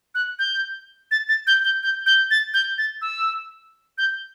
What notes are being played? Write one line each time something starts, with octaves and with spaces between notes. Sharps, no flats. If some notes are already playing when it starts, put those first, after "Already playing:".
F#6
G6
A6
A6
G6
G6
G6
G6
A6
G6
A6
E6
G6